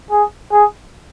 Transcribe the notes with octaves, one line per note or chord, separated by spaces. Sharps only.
G#4
G#4